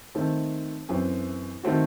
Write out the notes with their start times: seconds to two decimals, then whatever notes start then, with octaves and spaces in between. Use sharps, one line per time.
0.15 D#3 A3 C4
0.89 F#2 E3 C4
1.63 D#3 A3 C4 F#4